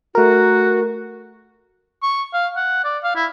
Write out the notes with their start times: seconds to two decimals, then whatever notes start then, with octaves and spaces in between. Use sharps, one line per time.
0.15 A3 F#4 A#4
2.03 C#6
2.33 F5
2.56 F#5
2.84 D5
3.04 F5
3.15 E4